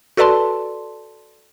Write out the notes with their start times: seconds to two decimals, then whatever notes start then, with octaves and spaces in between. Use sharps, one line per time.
0.17 F#4 A4 B4 D5 A5 C6